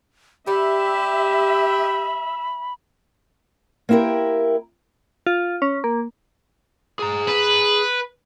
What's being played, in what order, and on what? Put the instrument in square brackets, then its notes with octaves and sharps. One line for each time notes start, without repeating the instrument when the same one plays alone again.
[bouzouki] G3 [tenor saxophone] G4 [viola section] E5 [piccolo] B5
[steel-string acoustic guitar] A#3 C4 E4 G4 A#4
[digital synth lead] F4
C#4
A#3
[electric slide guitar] G#4 A#5
[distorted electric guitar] B4